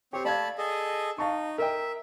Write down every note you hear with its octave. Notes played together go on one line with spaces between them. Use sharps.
C4 G4 C#5
A3 D5 F5 A5 B5 G#6
G#4 A4 D#5
D#4 F5 A5 C#6
A#4 D#5 E5 G5